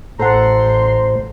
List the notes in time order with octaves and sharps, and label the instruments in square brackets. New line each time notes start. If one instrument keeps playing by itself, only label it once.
[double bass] A1 [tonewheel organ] A2 C5 [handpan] A4 F#5 [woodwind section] A#5 C6